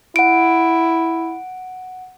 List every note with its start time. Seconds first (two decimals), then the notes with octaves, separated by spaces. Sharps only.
0.16 E4 F#5 D7